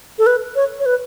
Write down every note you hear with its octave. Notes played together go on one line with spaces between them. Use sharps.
A4
B4
C#5
C#5
B4